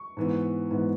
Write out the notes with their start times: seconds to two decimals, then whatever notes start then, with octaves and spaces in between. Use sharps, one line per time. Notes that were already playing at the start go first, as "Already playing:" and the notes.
Already playing: C#6
0.17 G#2 E3 B3
0.71 G#2 E3 B3